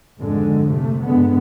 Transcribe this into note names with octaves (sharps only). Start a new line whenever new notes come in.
G#1 F2 G#2 D3 G#3
C3 A3
G2 D3 G#3 B3